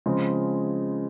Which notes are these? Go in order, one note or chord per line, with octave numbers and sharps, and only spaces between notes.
C#3 F3 G#3 C4